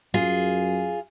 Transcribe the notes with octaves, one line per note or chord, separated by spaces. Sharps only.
F#2 F4 G#4